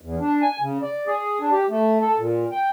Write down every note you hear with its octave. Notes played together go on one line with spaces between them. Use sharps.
E2
D4
G#5
C#3
D5
G#4
D4
G4
A3
A4
A#2
G5